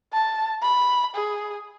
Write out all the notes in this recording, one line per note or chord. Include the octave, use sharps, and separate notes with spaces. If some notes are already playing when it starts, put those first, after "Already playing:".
A5
B5
G#4